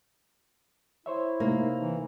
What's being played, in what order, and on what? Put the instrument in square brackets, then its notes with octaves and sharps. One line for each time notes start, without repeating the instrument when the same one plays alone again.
[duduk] E4 [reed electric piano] C5 C#5 E5
[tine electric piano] C3 D#4 [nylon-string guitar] A#3
[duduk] E3